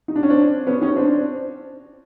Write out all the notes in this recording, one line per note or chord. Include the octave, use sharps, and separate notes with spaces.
D#4
D4
C#4
C4 D4
B3 C#4
C#4 D#4
C4 D4